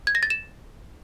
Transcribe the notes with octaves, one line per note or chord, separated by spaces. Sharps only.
G#6
A#6
A6
E7